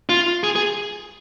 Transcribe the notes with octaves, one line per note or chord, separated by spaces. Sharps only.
F4
G#4
G#4